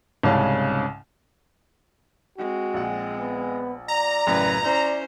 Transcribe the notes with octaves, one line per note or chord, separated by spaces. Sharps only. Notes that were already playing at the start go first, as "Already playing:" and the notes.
C2 G#2 C#3 C#4 F5 A5
G#3 C4 F#4
A#1 F#5
B3
D5 A#5
A1 F#2 C#3 B4
C#4 E4 C5 D5